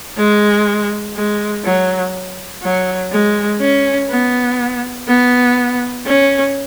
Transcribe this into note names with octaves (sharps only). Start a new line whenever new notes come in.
G#3
G#3
F#3
F#3
G#3
C#4
B3
B3
C#4